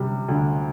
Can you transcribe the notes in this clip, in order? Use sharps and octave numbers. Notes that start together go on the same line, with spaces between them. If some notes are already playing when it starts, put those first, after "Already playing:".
Already playing: C3 G3
D2